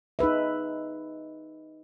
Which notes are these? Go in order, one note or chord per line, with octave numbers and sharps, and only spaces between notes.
D#4 G#4 B4 E5